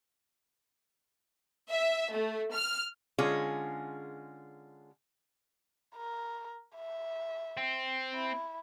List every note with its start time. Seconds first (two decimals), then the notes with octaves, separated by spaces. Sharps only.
1.70 E5
2.14 A3
2.53 F6
3.18 D3 G#3 C#4 F4 G#4
5.96 A#4
6.77 E5
7.57 C4
8.15 E4